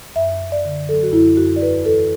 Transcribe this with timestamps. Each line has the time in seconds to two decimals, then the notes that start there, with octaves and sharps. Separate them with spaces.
0.16 F#2 E5
0.41 F#2
0.52 D5
0.65 D3
0.89 F#3 A4
1.03 F#4
1.13 F#2 E4
1.37 F#2 F#4
1.56 D5
1.62 E2 B4
1.85 E3 A4